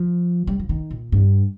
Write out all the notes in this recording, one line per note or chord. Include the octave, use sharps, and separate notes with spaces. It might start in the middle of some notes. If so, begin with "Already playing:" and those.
Already playing: F3
G3
F3
D#3
A#2
G2